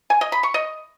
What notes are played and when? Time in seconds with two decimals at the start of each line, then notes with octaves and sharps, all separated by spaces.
0.10 G#5
0.21 D#5
0.32 B5
0.43 C#6
0.54 D#5